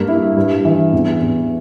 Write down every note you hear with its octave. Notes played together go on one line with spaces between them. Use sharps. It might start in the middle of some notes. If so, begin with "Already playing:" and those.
Already playing: G2 A#3
E4
G2
E3
E2
E2